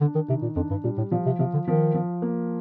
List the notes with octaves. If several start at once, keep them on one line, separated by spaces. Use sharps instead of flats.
D3 D4
D#3
C3 D#3
A#2
F2 D4
G2
A#2 G3
A2
A#2 F3
C3
C3 F3
D3
D#3 F3
F3
A#3